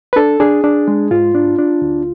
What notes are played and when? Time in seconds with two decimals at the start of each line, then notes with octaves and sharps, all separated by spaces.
0.13 B4
0.16 D4 A4
0.40 D4 G#4
0.64 D4
0.88 G#3
1.11 G#2 F4
1.35 D4
1.59 D4
1.82 D2